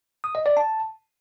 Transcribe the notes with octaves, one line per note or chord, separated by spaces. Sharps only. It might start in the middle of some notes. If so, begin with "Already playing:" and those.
D#6
D#5
D5
A5